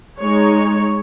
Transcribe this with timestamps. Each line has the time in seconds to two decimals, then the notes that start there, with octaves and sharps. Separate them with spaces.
0.19 G#3 D#4 C#5